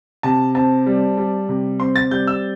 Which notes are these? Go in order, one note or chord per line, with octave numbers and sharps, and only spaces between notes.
C3 A5
C4 A5
G3
G3
C3
C4 C6
A6
G3 G6
E6